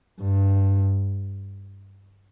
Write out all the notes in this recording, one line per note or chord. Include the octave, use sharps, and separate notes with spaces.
G2